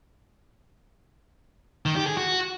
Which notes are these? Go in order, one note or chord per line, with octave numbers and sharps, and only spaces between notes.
D#3
G4
G#4
F#4